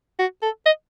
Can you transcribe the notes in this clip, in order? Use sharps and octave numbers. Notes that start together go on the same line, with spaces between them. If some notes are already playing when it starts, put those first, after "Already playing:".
F#4
A4
D#5